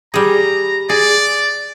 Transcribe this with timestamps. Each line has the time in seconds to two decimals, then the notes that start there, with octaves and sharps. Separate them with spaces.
0.14 G3 G#4 A#5
0.89 G#4 D5